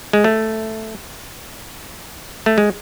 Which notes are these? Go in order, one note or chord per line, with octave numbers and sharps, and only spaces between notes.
G#3
A3
A3
G#3